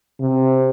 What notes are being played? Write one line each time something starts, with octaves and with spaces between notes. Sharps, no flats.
C3